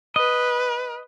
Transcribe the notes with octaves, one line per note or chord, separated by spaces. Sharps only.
B4 D#5